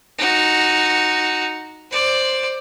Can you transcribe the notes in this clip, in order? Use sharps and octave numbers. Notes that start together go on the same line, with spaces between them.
D#4 F#4
C5 D5